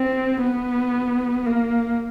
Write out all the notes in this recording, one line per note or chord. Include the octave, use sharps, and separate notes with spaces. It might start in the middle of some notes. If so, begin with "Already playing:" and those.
Already playing: C4
B3
A#3